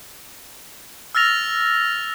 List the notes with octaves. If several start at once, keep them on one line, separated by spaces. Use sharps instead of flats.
E6 F6 A6 A#6 F7